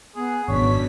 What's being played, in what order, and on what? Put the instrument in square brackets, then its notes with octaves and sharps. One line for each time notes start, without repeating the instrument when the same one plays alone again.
[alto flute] B3 [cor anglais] G#4
[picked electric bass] G#1 F#2 [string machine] B2 B6 [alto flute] D4 [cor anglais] C#5